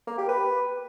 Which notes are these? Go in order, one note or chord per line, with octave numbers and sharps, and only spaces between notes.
A#3
G4
B4